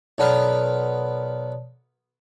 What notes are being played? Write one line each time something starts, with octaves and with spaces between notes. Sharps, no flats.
B1 B3 A#4 C#5 D5 A5